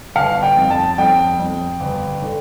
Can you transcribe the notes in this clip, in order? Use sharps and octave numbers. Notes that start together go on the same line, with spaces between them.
G1 F5
G5
F2
A5
F2 G5
F2
G1
D3